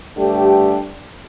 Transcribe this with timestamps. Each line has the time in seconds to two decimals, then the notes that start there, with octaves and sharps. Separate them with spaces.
0.16 G2 D3 A3 D4 G4